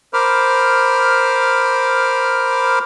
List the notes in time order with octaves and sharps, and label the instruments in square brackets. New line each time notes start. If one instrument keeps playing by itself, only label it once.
[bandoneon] A#4 C5 B5 D6 F6